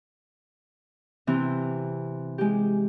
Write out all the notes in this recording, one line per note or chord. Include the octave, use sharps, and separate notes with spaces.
C3 E3 C4
G#3 G4